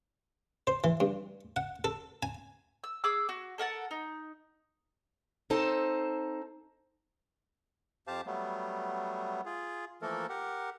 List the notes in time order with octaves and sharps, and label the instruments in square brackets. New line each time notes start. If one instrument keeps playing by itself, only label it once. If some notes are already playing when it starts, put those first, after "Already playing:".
[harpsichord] C5
E3
G2
F#5
A4
G#5
[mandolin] E6
G#4 D6 E6
F#4
A4 A#4 F#5 A5
D#4
[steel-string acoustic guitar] C4 D#4 A4 C5 A5
[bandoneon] F2 G4 C5 F5 A5
F#3 G3 A3 B3
F4 G#4
E3 F3 A3 A#3 A4 A#4
G4 A#4 F#5